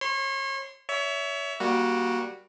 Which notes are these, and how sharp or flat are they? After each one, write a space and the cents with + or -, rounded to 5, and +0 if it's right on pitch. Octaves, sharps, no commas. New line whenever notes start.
C#5 -35 C6 -15
C#5 +30 E5 +0
G3 +0 A#3 +20 F#4 -5